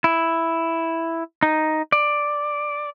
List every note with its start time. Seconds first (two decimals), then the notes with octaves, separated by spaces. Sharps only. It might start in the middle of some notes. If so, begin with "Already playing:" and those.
0.04 E4
1.43 D#4
1.92 D5